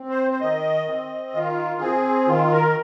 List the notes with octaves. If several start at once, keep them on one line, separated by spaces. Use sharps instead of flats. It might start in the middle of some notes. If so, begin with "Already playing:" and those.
Already playing: C4
C5
C5
D#3 D#5
C4
D#3 F4
C4 G#4
D#3 F4
A#4